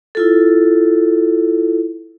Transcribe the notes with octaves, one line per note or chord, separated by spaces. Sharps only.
E4 F4 A4